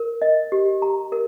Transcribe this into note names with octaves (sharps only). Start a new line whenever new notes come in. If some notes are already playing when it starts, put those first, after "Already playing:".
Already playing: A#4
D#5
G4
A#5
A#4